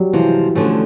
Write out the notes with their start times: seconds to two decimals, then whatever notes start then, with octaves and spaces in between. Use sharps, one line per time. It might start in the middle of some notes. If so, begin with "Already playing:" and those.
Already playing: F#3 G3
0.13 C3 E3 F3 G#3
0.55 D2 D3 F3 A3 C#4